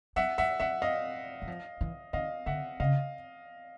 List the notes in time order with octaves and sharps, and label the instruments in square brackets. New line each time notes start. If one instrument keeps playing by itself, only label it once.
[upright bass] F#3 [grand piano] E5 F#5
[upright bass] F#3 [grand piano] E5 F#5
[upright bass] F#3 [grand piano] E5 F#5
[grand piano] D#5 F5
[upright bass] F#3
F3
E3
[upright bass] D#3 [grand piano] D#5 F5
[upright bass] D3 [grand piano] E5 F#5
[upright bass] C#3 [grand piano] D#5 F5